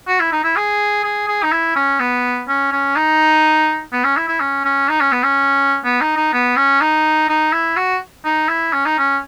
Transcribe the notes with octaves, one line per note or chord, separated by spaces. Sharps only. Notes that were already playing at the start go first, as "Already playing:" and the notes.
F#4
E4
D#4
E4
G#4
G#4
G#4
D#4
E4
C#4
B3
C#4
C#4
D#4
B3
C#4
E4
E4
C#4
C#4
D#4
C#4
B3
C#4
B3
D#4
D#4
B3
C#4
D#4
D#4
E4
F#4
D#4
E4
C#4
D#4
C#4